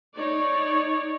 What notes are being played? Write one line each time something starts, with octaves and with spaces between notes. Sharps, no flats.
D#4 C#5 D5